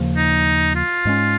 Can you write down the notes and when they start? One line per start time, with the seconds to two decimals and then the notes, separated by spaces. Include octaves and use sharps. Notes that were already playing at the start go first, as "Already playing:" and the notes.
Already playing: D#2 C#3 F3 A#3
0.17 D#4
0.75 F4
1.05 G#2 G#3 C#4